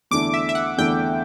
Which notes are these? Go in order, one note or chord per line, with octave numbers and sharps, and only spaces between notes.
E2 D3 A3 E4 D6
E5
E5
F#5
E2 D3 A3 E4 G5